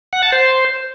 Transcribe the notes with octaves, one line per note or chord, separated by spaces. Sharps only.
F#5
A5
C5